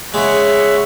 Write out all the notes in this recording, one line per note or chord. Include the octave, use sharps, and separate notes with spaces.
C#3 G#3 C#5 E5 F#5